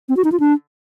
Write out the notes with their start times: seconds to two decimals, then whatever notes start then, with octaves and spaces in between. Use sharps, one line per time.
0.09 C4
0.17 F#4
0.24 D#4
0.32 F4
0.40 D4